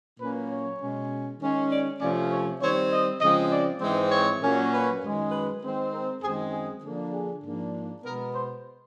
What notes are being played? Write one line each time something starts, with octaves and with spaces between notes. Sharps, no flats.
A#2 F#3 A#3 C#4 B4
C#5
B2 G#3 C#4
D#3 G#3 C#4
D5
C3 F3 A3 C#4 D5
C#5
D#3 G3 C4 C#5
D#5
C#3 F3 G#3 C4 D#5
D5
G#2 E3 G#3 C4
C#5
A#2 F#3 A#3 C#4
B4
F#2 D#3 G#3
B4
D#3 G#3 C4
A#4
F#2 D#3 G#3 C4 G#4
G#4
D3 F3 A#3 D4
G#4
G#2 F3 A#3 D4
B2 G#3 B3 A#4
C5